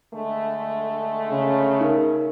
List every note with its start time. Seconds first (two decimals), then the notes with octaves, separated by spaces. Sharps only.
0.14 D3 G#3 A3
1.31 C#3
1.81 D#4 A#4